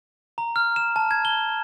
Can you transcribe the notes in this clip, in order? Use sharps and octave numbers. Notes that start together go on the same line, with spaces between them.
A#5
F6
E7
A5
G#6
G7